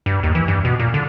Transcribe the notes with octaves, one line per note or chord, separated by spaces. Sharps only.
G2
D#2
E3
G2
B2
A#2
D3